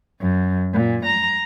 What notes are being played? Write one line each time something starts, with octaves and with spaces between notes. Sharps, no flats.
F#2
A#2
A#5